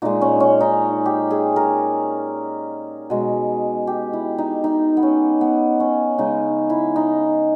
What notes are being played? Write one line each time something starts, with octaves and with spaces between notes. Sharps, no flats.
A#2 G#3 D#4
C#4
C#4
D#4
G4
G#4
A#4
B2 G#3
G4
E4
D#4
D#4
B3
C#4
B3
C#4
C#3 G#3 D#4
E4
D#4